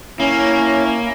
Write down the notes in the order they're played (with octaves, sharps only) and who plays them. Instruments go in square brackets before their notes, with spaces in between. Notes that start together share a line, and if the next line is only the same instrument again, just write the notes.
[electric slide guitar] A#3 [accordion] C#4 [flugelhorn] E4